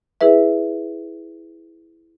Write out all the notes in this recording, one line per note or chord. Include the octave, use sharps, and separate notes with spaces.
E4 G#4 B4 E5